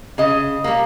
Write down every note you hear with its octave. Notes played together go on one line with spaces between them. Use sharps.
C#3 D#5
G3 A#3